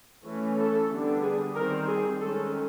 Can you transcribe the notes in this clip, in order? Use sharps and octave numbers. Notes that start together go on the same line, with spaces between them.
E3 A3 C#4
A4
D3 G3 B3 D4
G#4
D#3 G3 C4 A#4
G#4
D#3 G#3 C#4 A4